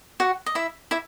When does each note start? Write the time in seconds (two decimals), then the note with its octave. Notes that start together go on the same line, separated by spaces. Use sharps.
0.20 F#4 F#5
0.46 D#5
0.55 E4 E5
0.91 E4 E5